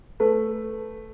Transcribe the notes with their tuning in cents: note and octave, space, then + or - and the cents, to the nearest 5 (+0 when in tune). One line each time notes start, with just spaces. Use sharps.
A3 +0 B4 +0